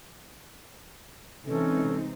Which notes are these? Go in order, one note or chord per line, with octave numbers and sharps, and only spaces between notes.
C3 E3 G#3 C4 C#4 D#4 A4